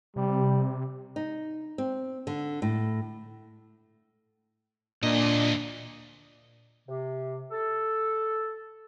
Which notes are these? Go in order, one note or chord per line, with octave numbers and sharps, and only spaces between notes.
C3 G3
D#4
C4
D3
A2
D2 A#2 D4 D#5
C3
A4